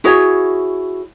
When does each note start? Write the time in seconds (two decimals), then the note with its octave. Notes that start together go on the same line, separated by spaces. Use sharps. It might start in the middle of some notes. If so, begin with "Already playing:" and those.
0.04 E4 F#4 G#4 C#5